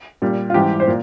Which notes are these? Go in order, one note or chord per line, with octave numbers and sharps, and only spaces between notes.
A#2 G3
F4
G#2 E3 G3 G4
C5
A#2